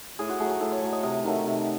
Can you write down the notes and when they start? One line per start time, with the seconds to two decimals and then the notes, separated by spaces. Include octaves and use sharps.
0.19 A2 G#4
0.29 F#4
0.39 F#3 A3 G#4
0.50 G#4
0.60 A2 A4
0.71 C#5
0.82 F#3 A3 C#5
0.92 D#5
1.03 C3 D#5
1.24 D#3 F#3 A3
1.45 C3